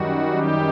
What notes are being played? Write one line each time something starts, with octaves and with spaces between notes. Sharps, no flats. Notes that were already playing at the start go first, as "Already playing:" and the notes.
Already playing: F#2 D#3 G3 F#4
G4